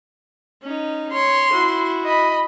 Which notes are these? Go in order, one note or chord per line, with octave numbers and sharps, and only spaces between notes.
C#4 D#4
C#5 C6
E4 F#4
D#5 B5